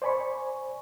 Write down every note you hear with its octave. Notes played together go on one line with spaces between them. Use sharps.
C5 D5 G#5 B5 C#6